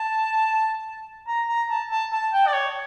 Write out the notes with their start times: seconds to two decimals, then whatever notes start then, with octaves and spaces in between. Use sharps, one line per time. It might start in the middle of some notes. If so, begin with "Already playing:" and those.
Already playing: A5
1.27 A#5
1.49 A#5
1.70 A5
1.91 A5
2.12 A5
2.33 G5
2.47 D5
2.54 C#5